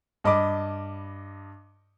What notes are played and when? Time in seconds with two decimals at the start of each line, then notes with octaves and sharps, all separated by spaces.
0.24 G2 D#5 B5 D6